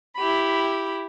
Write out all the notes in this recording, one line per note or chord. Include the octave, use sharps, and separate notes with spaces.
E4 G4 B5